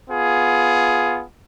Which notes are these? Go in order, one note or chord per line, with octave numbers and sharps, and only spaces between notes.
B3 F4 G#4